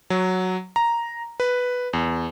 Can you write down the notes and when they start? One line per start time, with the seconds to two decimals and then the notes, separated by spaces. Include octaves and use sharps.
0.10 F#3
0.76 A#5
1.40 B4
1.93 E2